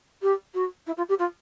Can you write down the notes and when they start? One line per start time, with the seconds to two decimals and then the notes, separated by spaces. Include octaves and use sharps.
0.22 G4
0.54 F#4
0.86 E4
0.97 F4
1.09 G4
1.18 F4